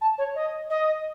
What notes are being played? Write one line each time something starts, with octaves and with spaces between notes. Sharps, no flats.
A5
C#5
D#5
D#5